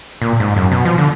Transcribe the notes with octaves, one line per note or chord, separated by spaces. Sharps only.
A#2
G#2
F#2
B2
F3
D3